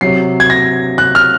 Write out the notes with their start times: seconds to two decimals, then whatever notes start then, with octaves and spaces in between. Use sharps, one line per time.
0.01 C3 F#3 C7
0.40 G#6
0.50 A#6
0.98 F#6
1.15 F6